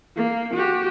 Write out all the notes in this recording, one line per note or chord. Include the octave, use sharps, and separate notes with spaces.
A#3
F#4 G4